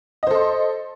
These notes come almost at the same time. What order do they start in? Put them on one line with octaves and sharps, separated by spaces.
D#5 C5 A4 C6